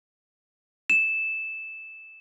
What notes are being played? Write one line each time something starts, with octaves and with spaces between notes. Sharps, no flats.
E7